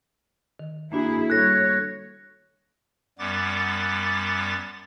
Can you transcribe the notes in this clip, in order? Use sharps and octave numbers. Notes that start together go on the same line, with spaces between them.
D#3
A#3 D4 E4 F#4 G#4
G3 A4 C#5 F#6 A#6
F#2 G3 B3 D6 A6